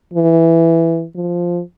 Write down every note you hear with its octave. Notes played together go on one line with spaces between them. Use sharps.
E3
F3